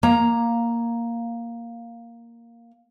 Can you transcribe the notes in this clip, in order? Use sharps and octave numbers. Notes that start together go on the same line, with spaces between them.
A#3 A#5